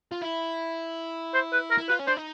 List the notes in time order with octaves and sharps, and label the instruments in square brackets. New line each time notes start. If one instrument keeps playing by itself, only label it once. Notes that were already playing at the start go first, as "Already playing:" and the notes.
[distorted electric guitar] F4
E4
[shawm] C5
B4
A#4
[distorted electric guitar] E4
[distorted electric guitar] F4 [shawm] B4
[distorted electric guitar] C#4
[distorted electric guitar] D4 [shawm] C5
[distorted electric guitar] D#4